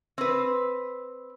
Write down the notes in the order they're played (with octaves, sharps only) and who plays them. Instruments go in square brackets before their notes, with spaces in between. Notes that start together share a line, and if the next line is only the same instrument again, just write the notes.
[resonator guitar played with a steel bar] C4 B4